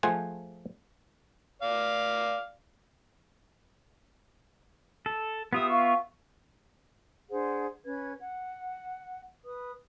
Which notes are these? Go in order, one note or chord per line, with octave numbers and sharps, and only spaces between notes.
F3 A3 G#4 C5 F#5 G#5
D5 F5
A4
B3 F4 G4 E5 D#6
F5 C#6
D4 G#4 C5 F#5
C#4 B4 G#6
F#5
B4 D#6